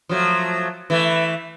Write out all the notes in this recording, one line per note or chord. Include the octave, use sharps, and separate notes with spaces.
F3 F#3 A3
E3 A3